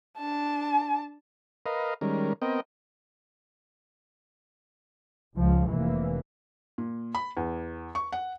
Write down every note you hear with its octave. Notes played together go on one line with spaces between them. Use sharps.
D4 A5
A#4 B4 D#5 F5
D#3 G3 G#3 C#4 A#4
B3 C4 A#4 D#5 G5
C#2 F3
F1 E3 A#3
A#2
B5
E2
C#6
F#5